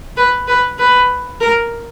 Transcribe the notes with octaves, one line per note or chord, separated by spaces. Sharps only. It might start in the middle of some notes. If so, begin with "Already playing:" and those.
B4
B4
B4
A#4